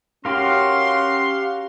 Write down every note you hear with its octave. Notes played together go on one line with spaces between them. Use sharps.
C#4 F#4 G4 A#4 F5 C6